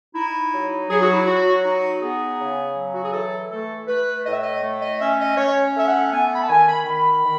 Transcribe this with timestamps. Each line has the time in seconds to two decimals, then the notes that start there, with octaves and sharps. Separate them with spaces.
0.14 D#4 E4
0.51 F#3
0.89 F#3 G#4
1.01 F#4
1.13 E4
1.25 F#3 F#4
1.63 D#4 F#4
2.00 B3 G#4
2.38 C#3
2.76 F#3
2.93 F#4
3.03 G#4
3.13 E3 A4
3.50 A3 A4
3.87 A3 B4
4.25 A2 D#5
4.33 E5
4.42 D#5
4.62 A3
4.81 D#5
4.99 C#4 E5
5.19 D#5
5.37 C#4 C#5
5.74 A3 E5
5.87 F#5
6.12 B3 G#5
6.34 B5
6.41 A5
6.49 D#3 G#5
6.67 B5
6.86 D#3 B5
7.23 D#3